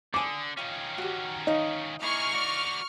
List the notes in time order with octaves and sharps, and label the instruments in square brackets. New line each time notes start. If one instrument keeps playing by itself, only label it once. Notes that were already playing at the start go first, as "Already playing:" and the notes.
[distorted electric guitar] D3 [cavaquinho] A4 G#5 D#6 [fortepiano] D6
[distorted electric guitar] D#3 C#4 [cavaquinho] F4 G5
[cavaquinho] F#4 G4
[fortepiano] D#4 [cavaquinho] C#5 D#5 F5
[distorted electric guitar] A#3 G#4 [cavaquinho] E4 [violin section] C#6 F6
[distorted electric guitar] F#4 D5